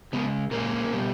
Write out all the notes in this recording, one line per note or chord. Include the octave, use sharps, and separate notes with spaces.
C#3 G#3 B3
A#2 G#3 A#3 C#4
B2 G3